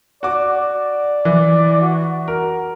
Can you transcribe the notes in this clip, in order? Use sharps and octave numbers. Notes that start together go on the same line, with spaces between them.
F#4 D5 D6
E3
F#4
A#4